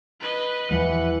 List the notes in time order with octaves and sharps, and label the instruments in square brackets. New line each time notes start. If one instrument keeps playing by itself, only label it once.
[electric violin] B4 D#5
[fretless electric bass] E2 F3 G3 [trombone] E3 [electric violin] F#5